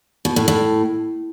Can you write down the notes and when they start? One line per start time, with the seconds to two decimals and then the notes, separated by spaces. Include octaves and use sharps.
0.25 B2
0.36 A2
0.48 A2